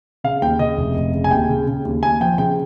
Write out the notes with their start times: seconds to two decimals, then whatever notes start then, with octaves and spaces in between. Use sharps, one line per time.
0.24 C#3 F5
0.42 D#2 G5
0.59 C#3 D#5
0.77 F1
0.96 F1
1.13 C#3
1.24 G#5
1.31 D#2 G5
1.49 C#3
1.67 C#3
1.85 D#2
2.03 D#2 G#5
2.21 F3 G5
2.38 C#3 G5